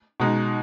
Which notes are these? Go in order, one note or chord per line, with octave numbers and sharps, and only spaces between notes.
B2 G#3 D#4